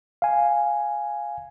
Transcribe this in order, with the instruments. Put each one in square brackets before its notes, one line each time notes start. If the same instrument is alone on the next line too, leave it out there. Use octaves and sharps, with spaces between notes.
[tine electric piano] F5 G#5